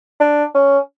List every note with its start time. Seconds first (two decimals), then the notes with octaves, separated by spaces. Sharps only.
0.20 D4
0.54 C#4